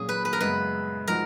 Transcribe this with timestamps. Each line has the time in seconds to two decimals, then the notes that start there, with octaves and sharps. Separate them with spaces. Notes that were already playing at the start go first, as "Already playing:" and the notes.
Already playing: A#2 F#3 C#4 G#4
0.09 B4
0.25 B4
0.33 A#4
0.40 F#2 C#3 G#3 B3 B4
1.08 F3 G#3 D#4 F#4 A#4